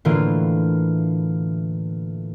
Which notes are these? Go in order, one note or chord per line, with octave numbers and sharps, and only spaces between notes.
A2 D3 E3 A#3 F4